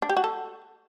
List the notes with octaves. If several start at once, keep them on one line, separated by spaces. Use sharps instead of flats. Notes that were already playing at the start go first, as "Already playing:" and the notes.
D4
G4
F#4
A4